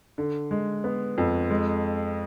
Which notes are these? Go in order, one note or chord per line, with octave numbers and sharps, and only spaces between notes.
D3
G#3
B3
F2
G#3